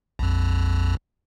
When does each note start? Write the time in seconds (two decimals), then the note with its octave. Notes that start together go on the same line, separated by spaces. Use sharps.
0.19 A#1 F2